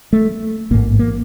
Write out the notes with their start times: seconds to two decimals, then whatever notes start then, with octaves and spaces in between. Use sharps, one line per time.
0.13 A3
0.71 A1 G#2 A#3
0.99 A#3